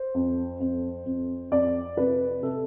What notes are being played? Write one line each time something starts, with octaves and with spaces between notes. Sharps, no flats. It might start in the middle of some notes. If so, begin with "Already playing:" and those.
Already playing: C5
F2
F2
F2
F2 D5
C3 B4
C3 A4